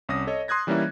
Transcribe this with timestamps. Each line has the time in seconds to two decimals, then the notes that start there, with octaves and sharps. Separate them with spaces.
0.09 C2 C#4 D#6 A#6
0.27 A4 C#5 D#5
0.48 C6 D#6 F#6 G#6 A#6
0.67 E3 G3 A#3 C#4 D#4 E4